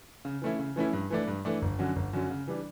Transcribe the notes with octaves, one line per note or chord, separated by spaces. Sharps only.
C#3
E3 A3 C#4 E4
C#3
E3 A3 C#4 E4
G2
E3 A3 D4
G2
E3 A3 D4
G1
F#2 D3 F#3 C#4
G1
F#2 D3 F#3 C#4
C#3
E3 G3 D4